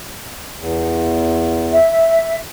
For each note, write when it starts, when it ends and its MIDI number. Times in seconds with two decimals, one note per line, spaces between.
0.59 1.78 40
1.72 2.40 76